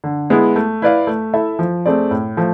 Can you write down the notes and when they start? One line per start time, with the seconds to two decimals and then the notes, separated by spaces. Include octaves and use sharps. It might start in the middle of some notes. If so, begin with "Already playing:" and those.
0.04 D3
0.30 G#3 B3 E4
0.56 A3
0.82 E4 B4 D5 F5
1.07 A3
1.34 E4 A4 E5
1.59 F3
1.86 A3 C4 G#4 D5
2.11 A2
2.37 F3 A3